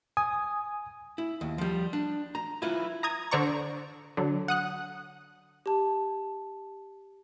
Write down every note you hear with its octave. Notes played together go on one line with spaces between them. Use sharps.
G#5 D#6
E4
D#2
F3 G3
D4
A#5
E4 F4 B4
A#5 D#6 G#6
D3 C5 D5 A#5 C#6
D3 F#3
F#5 D#6 F#6
G4 A5